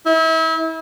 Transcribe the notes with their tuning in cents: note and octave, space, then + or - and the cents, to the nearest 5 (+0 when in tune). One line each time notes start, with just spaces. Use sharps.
E4 -35